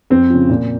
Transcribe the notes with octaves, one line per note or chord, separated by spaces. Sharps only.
F2 C4
C#3 F3
A#2